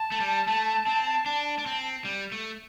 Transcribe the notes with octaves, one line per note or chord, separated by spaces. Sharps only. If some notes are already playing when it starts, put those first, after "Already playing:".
Already playing: A5
A3
G3
A3
C4
D4
D4
C4
G3
A3